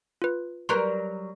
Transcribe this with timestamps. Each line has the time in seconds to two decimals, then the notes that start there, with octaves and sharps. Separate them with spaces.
0.22 F4 B4
0.69 F#3 G3 A#4 B4 A#5 C6